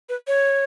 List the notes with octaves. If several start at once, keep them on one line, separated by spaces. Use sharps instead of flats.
B4
C#5